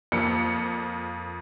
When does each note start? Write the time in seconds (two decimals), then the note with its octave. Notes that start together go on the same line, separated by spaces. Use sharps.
0.12 F2 A#3 C#7